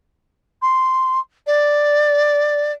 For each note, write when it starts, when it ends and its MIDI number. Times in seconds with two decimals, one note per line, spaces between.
0.62 1.19 84
1.47 2.72 74